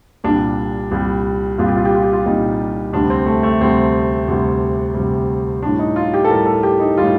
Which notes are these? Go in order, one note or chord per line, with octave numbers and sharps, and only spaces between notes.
C2 A#2 G3 D4
C2 A#2 G3
C2 A#2 G3 F4
G4
F4
G4
F4
G4
F4
C2 A#2 G3 D#4
D2 C3 G3 D4
C4
A3
A3
D2 C3 G3 C4
D2 C3 G3
D2 C3 G3
A2 G3 D4
D#4
F4
G4
A4
A2 G3 A#4
A4
G4
D#4
A2 G3 F4